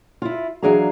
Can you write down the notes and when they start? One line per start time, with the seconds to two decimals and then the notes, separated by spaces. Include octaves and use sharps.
0.22 E4 F4
0.63 E3 F#3 D4 G#4 F5 A#5